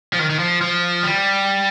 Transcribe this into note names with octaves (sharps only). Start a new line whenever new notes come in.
F3
D#3
D#3
F3
F3
G3